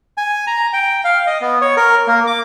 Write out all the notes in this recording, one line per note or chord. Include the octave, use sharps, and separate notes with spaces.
G#5
A#5
G5
F5
D#5
B3
C#5
A#4
A#3
D6